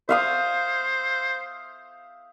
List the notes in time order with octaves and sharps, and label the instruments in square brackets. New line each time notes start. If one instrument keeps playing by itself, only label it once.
[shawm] C5 [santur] E5 F5 D#6